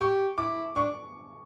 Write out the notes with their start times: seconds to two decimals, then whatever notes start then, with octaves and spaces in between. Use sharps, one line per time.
0.01 G4 C#6
0.38 E4 D6
0.76 D4 C#6